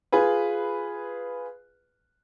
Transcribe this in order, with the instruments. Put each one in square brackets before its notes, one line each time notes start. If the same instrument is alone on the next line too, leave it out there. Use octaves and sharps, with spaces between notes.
[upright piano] F4 G#4 B4